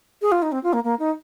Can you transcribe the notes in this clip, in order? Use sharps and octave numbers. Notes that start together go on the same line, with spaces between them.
G#4
F4
D#4
C4
F4
A#3
A#3
D#4